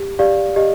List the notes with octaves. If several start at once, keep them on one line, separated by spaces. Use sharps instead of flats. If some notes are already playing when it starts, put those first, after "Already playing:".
Already playing: G4
G4 D5 F5
G4 D#5